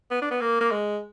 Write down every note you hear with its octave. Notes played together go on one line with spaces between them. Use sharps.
B3
D4
B3
A#3
A#3
G#3